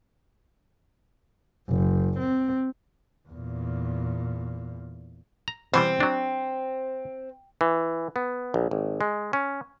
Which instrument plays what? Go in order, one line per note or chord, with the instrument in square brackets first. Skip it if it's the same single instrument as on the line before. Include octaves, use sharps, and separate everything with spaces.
[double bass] F#1
C4
E2 A#2
[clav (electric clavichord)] A#5
[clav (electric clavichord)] B2 E3 G3 [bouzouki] C4
[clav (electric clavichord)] F#3 D4
E3
B3
A#1
G#1
G#3
C#4